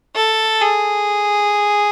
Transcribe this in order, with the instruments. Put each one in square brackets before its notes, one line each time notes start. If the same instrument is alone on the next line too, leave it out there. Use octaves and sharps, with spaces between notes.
[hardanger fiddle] A4
G#4